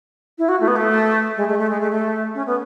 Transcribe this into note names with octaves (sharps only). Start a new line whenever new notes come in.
E4
F#4
A3
B3
A3
G#3
A3
A3
G#3
A3
A3
C#4
B3